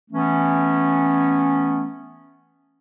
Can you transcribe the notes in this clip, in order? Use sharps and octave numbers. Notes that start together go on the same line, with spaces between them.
E3 A3 B3 C#4